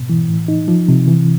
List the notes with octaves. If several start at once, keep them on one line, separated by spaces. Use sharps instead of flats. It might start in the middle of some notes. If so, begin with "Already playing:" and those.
Already playing: G#2 B2
E3
A2
D#4
F3
C3
E3